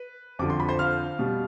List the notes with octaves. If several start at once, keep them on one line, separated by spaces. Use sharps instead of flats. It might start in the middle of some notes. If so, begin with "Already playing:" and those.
Already playing: B4
F2 D3 F3 D6
C6
B5
C5 C6
F5 F6
B2 G3